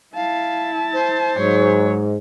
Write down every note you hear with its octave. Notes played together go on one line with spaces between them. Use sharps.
E4 F5 A5
C5
G#2 F#3 C#5